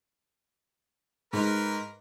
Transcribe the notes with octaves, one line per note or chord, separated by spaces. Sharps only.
G#2 A#4 B4